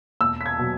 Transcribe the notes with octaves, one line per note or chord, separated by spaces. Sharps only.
E1 E6
B6
G#6
B2 F#3